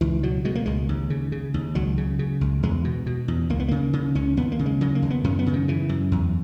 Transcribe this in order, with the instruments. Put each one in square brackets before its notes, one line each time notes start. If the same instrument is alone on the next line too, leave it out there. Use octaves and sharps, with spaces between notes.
[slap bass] C#2 E3
B2 F#3
B2 G#3
A#3
C#2 G#3
D#2
C#3
C#3
D#2
C#2 F#3
C#3
C#3
C#2
E2 G#3
B2
B2
E2
C#2 A#3
B3
C#3 A#3
C#3
C#2 C#4
D#2 B3
A#3
C#3
G#3
C#3 F#3
A#3
D#2
B3
F#2 C#4
B3
C#3
D#3
C#3 E3
F#2
E2